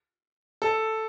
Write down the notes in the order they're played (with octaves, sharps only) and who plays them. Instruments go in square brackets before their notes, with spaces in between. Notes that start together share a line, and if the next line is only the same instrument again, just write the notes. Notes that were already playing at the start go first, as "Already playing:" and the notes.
[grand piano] A4